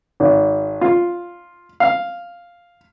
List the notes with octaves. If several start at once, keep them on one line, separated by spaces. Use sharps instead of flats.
G#1
F4
F5